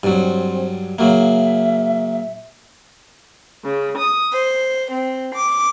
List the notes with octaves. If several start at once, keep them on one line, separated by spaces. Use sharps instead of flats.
G2 F#3 C4
C#3 F#3 A#3 E5
C#3
D#6
C5
C4
D6